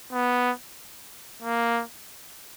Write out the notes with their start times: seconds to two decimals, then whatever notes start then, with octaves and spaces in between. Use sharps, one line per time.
0.12 B3
1.43 A#3